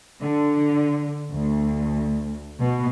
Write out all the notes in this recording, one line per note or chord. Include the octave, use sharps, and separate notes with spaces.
D3
D2
B2